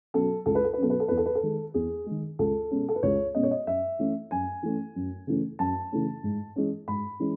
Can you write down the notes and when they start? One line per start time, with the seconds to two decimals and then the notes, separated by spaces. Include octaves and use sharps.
0.14 B2 F#3 C#4 A4
0.46 C#2 A4
0.55 B4
0.64 A4
0.74 B4
0.78 B2 F#3 C#4 A4
0.90 B4
1.00 A4
1.08 E2 B4
1.17 A4
1.26 B4
1.35 A4
1.43 D#3 G#3
1.74 E2 G#4
2.06 D#3 G#3
2.39 C#2 A4
2.71 B2 G#3 C#4
2.89 A4
2.95 B4
3.03 C#2 C#5
3.34 B2 G#3 C#4 D#5
3.43 C#5
3.51 D#5
3.67 F#2 E5
3.99 E3 A3 C#4
4.31 F#2 G#5
4.63 E3 A3 C#4
4.96 F#2
5.27 C#3 E3 A3 C#4
5.59 F#2 A5
5.92 C#3 E3 A3 C#4
6.23 G#2
6.56 E3 G#3 C#4
6.88 G#2 B5
7.20 E3 G#3 C#4